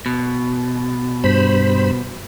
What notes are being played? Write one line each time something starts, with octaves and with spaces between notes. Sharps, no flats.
B2
G2 C5 B5